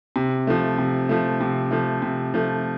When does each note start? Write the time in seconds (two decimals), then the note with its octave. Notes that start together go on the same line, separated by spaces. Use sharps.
0.16 C3
0.47 F3 A3
0.78 C3
1.09 F3 A3
1.41 C3
1.71 F3 A3
2.02 C3
2.34 F3 A3